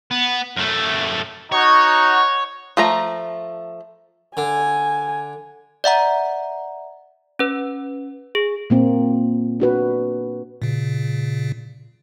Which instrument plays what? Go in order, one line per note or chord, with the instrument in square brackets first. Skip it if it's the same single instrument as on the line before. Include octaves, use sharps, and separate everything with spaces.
[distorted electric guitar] B3
F#2 A3
[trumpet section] D#4 F#4 [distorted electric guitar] C#5
[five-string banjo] F3 A3 A#5
[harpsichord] D3 [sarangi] G#5
[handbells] D5 E5 F#5 A#5
C#4 B4
G#4
[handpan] A#2 A#3 C4
D4 F#4 B4
[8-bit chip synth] A#2 C#3